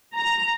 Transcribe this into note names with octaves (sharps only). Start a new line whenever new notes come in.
A#5